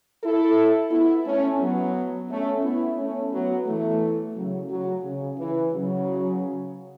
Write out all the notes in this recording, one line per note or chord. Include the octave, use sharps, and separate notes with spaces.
E4 A4
B3 E4
A3 C#4
F#3 B3
A3 C#4
B3 E4
A3 C#4
F#3 B3
E3 A3
C#3 F#3
C#3 F#3
C#3
E3
C#3 F#3